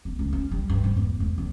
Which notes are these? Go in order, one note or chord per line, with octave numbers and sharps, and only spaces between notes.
B3
C#2
C#4
G3
G2
G#2
E2
E2
E2